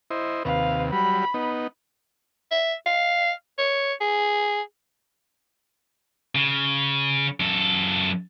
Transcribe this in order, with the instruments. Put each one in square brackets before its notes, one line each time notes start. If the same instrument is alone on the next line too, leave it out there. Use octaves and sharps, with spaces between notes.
[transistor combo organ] E4 C5 D#5
[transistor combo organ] D#2 C3 [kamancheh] B4 F5
[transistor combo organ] F#3 G3 [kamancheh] B5
[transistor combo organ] B3 D#4
[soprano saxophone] E5
F5
C#5
G#4
[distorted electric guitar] C#3
F#2 A4